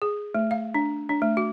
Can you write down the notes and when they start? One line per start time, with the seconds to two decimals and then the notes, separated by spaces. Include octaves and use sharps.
0.02 G#4
0.35 A3
0.51 F5
0.75 D4
1.09 D4
1.22 A3
1.37 F#4